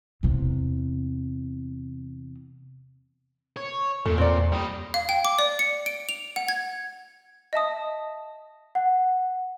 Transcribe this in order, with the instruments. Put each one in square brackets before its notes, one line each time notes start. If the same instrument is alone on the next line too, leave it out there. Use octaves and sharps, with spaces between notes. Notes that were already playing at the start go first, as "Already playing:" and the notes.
[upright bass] E2 C3
[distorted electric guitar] C#5
[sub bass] E2 [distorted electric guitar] A#2 [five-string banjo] A3
[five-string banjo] C4 D5
[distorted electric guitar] G3 D#5 [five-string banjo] G4
[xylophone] F5
G5
D6
D5
C#7
D7
F7
F#5
G#6
D#5 E5 A5 D#6
[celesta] F#5